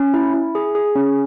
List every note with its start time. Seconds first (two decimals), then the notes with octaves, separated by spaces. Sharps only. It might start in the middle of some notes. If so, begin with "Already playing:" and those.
Already playing: C#4
0.14 E4
0.34 E4
0.55 G#4
0.75 G#4
0.95 C#4